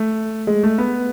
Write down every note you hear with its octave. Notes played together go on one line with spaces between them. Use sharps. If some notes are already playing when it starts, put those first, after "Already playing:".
Already playing: A3
G#3
A3
B3